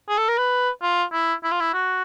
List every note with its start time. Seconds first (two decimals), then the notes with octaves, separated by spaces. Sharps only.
0.09 G#4
0.18 A4
0.29 A#4
0.38 B4
0.82 F4
1.13 E4
1.44 E4
1.52 F4
1.60 E4
1.74 F#4